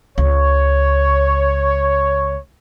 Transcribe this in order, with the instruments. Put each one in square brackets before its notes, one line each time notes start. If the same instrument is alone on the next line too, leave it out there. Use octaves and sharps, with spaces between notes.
[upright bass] C#2 [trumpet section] C#5